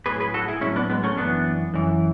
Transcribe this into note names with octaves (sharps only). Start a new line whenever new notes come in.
A2 F#3 G#4 B4
G#4 B4
F#4 A4
E4 G#4
A2 F#3 C#4 E4
B3 D4
G#3 B3
A3 C#4
F#2 E3 B3 D4
F#2 E3